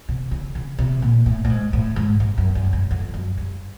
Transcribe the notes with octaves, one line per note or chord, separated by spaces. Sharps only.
C3
C#3
C#3
C3
A#2
A2
A2
G#2
A2
G#2
G2
F#2
F#2
G2
F2
F#2
G2